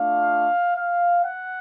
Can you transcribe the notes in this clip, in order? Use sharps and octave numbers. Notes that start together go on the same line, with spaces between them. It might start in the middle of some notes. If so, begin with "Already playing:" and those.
Already playing: A3 D4 F4 F5
F5
F#5